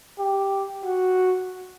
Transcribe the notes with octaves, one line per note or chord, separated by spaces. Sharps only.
G4
F#4